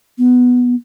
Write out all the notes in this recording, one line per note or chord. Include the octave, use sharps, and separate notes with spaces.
B3